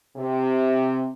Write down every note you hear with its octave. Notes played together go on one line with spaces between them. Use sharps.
C3